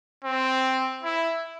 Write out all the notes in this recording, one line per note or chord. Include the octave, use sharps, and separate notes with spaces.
C4
E4